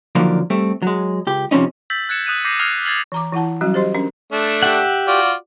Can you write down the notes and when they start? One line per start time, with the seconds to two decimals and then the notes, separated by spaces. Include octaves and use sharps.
0.15 D3 D#3 F3 F#3 A#3 D4
0.50 G3 A3 C4
0.82 F#3 G#3
1.27 C#2 G4
1.51 C3 F3 C4 C#4 D#4
1.90 E6 G6 A6 B6 F#7
2.09 F#6 G#6 A6 C#7 E7
2.26 D#6 F#6 D#7 E7
2.45 D6 G6 A#6 C7 D#7
2.59 D#6 F6 G6 G#6 C7 F7
2.86 F6 G#6 A6 C7 F#7
3.12 E3 A#5 D6
3.32 E3 E4 F#5 A5
3.61 F#3 G3 C#4 F#4
3.74 G4 C5 D#5 C6
3.94 C#4 D4 A#4
4.32 A3 D4
4.63 G4 E5 F#5
5.07 F4 F#4 D5